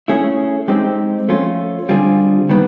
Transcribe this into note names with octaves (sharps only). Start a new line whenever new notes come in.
A3 C#4 E4 G#4
G#3 C4 D#4 G4
F3 A3 C#4 F4
D3 G3 C4 F4 G#4
D#3 G3 B3